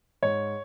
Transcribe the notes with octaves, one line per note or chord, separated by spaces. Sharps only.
G#2 C#5